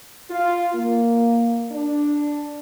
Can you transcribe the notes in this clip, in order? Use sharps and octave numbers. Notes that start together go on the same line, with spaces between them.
F4
A#3
D4